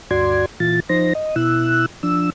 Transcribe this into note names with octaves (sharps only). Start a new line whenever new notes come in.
D2 G2 F#4 D5 C6 G#6
A#2 E3 F4 A6
F3 D#4 C5 A#6
D#5
B2 E4 E6 F#6
F3 D4 E6